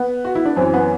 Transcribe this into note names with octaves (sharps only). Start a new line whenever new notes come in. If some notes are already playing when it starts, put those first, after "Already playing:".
Already playing: B3
F#4
E4
D4
F#2 E3 C4
B3